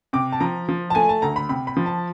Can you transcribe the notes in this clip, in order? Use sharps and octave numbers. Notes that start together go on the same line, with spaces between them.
C3 D6
A5
F3 A#5
F3
A5
A3 G#5
A5
D2 A#5
B5
C3 B5
B5
F3
A5